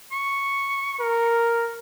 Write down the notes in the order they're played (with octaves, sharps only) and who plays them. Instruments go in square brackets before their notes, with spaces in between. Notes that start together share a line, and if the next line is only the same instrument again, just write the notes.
[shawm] C#6
[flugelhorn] A#4